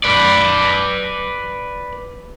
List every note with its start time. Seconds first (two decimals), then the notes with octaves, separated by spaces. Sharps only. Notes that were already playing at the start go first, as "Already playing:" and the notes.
0.04 B4 D5